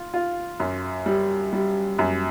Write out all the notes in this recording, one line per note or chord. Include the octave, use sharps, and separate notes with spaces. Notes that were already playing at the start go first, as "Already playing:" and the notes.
Already playing: F4
F4
F#2
G3
G3
F#2